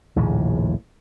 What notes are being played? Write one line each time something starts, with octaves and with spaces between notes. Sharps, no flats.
A#1 D#2 A2 C#3